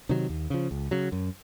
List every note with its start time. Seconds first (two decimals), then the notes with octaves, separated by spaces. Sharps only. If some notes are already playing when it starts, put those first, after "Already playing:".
0.09 C3 D#3 F#3
0.29 D#2
0.50 C#3 F3
0.71 C#2
0.91 C#3 F#3
1.12 F#2